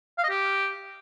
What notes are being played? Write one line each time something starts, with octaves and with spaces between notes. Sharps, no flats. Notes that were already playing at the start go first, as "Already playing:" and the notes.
F5
D#5
G4